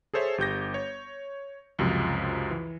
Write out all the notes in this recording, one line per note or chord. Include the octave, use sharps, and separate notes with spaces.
G#4 A4 C5 C#5 E5
G1 G4 G6 A#6
C#5
C#2 F#2 C3 F3
E3